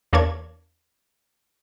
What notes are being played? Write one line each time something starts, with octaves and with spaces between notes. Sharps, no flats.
E2 A#3 D4 C#5 G#6